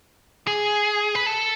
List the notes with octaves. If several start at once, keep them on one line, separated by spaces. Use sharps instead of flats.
G#4
B4
A4